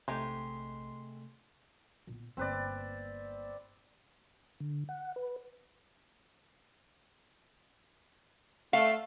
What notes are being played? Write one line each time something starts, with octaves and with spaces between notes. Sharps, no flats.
A#1 C3 G#3 A3 D#4 G4 C6
A#2 B3
G1 A#3 C4 B4 D5
D3
F#5
B4
A3 F5